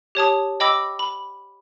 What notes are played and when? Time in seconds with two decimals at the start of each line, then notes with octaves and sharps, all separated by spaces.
0.15 G4 C#5 A5 D#6
0.60 D#5 G5 B5 D6 E6 A#6
0.99 B5